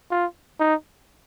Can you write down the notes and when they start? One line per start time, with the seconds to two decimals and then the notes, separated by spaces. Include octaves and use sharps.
0.11 F4
0.60 D#4